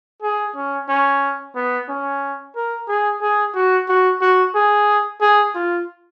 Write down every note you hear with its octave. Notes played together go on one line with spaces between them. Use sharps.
G#4
C#4
C#4
B3
C#4
A#4
G#4
G#4
F#4
F#4
F#4
G#4
G#4
F4